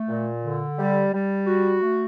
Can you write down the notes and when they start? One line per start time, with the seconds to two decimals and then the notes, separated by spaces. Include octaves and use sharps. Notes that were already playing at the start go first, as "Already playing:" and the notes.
Already playing: A3
0.08 A#2
0.43 D3
0.78 G3
1.12 G3
1.47 F#4
1.82 A3